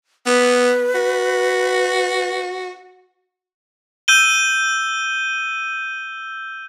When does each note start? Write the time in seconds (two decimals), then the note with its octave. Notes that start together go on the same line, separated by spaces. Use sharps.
0.26 B3 B4
0.95 F#4
4.08 E6 G6 D#7 G7